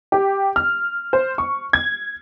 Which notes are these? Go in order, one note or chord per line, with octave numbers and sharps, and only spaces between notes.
G4
F6
C5
C#6
G#6